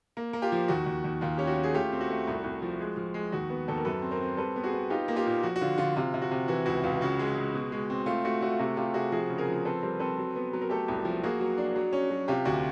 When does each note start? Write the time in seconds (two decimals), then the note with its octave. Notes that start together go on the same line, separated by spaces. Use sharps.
0.17 A#3
0.33 A#3
0.42 F4 G4
0.52 F3
0.68 D#2 F#4
0.86 D#2
1.04 D#2
1.21 D#2 F4
1.37 C#4 G4
1.47 F#4
1.57 C#4
1.64 G#4
1.74 A3 F4 G4
1.92 C4
2.01 F#4
2.10 A3
2.27 C2
2.44 C2
2.62 F3
2.80 G#3
2.97 F3
3.14 G#3
3.32 D#2 F#4
3.50 B3
3.68 D#2 A4
3.77 A#4
3.85 F#2 A4 B4
4.02 C4
4.11 A#4 C5
4.21 C4
4.37 G3 A4 B4
4.56 B3
4.64 F#4 G#4
4.74 B3
4.90 D#4 F4 G4
5.08 A#3
5.16 F4 G4
5.26 A#2
5.43 F3 F#4
5.56 F#4
5.61 D3 F4
5.78 D3 F4
5.96 C3 F4
6.14 C3
6.22 F#4
6.31 C3
6.48 E3 F#4
6.66 C#2 F#4
6.83 C#2 F4
7.01 C#3 F#4
7.19 G#3
7.37 G#3
7.54 B2
7.72 G#3
7.90 C4
8.06 A3 F4
8.25 A3 F#4
8.42 A3 F#4
8.52 F4
8.59 C3 F#4
8.77 C3 F4 G4
8.94 C3 F#4 G#4
9.12 F3 F#4 G#4
9.30 C#3
9.38 G#4 A#4
9.48 F3
9.65 C4 A4 B4
9.83 G3 A#4 C5
9.99 C4 A4 B4
10.17 F#3
10.36 B3
10.53 F#3
10.62 A#4
10.70 A3 G4 A4
10.88 C2
11.05 F3
11.23 A#3 F#4 G#4
11.40 F#3
11.57 D4
11.76 F#3
11.93 C#4
12.10 F#3
12.28 C3 F4 G4
12.45 D2 F#4